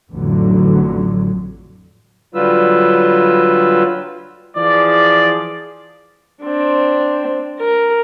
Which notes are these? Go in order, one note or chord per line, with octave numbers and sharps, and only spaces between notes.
A1 F2 D3 F#3
D3 F#3 G3 F4 B4 E6
E3 F3 G#4 D5
C4 D4
A#4